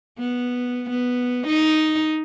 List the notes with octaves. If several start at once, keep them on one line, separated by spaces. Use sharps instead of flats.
B3
B3
D#4